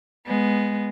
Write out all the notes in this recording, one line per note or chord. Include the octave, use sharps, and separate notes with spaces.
G#3 B3